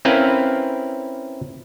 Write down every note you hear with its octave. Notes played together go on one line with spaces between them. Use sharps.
C4 C#4 E4 A#4 B4 F5